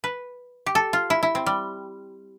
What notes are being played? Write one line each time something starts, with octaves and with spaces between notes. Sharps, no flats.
B4
G4
A4
F4
E4
E4
C4
G3